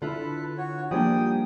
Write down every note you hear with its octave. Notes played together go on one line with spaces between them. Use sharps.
D3 E4 F4 A4 B4
F#4 C#5
F3 G3 A#3 D4 G4 G#4 G5 D#6